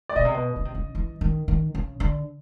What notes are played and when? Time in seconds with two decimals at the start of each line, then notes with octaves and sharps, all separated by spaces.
0.09 D5
0.16 B2 D#5
0.25 C3
0.34 B2
0.56 C#3
0.65 C3
0.74 C#3
0.95 E3
1.21 D#3
1.48 D#3
1.75 C#3
2.00 D3